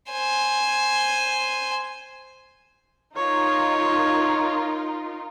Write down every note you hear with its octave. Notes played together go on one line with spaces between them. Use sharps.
C5 G#5
D#4 F4 A#4 C#5